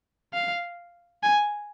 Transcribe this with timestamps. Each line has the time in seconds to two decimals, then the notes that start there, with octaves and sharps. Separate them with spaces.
0.34 F5
1.23 G#5